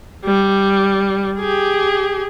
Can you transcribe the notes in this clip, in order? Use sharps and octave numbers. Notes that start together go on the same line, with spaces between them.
G3
G4 G#4